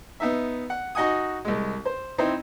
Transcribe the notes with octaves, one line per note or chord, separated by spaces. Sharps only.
B3 D#4 E5
F#5
D#4 F#4 D#5 F#5 G#5 D#6
C2 G#3
C5
C4 D#4 E4 C5